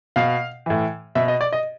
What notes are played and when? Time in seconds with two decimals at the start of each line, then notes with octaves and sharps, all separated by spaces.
0.16 B2 F5
0.66 A2 E3
1.15 B2 E5
1.28 D#5
1.41 D5
1.53 D#5